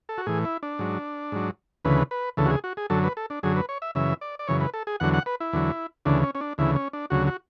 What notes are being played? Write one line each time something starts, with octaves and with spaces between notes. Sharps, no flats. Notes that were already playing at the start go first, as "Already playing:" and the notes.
A4
F#4
A2 E3 G#4
E4
D4
G#2 F#3
G#2 F#3
D2 C#3 E3 B4
B4
D2 C#3 E3 A4
F#4
G#4
F#4
G#4
F#2 D3 F#3 A4
B4
A4
D4
F#2 D3 F#3 G#4
B4
C#5
E5
F#2 C#3 E3 E5
D5
D5
F#2 C#3 E3 C#5
B4
A4
G#4
E2 D3 F#3 F#5
F#5
B4
E4
E2 D3 F#3
D2 C#3 E3 D4
C#4
C#4
D4
D2 C#3 E3 E4
C#4
D4
D2 C#3 F#3 F#4
F#4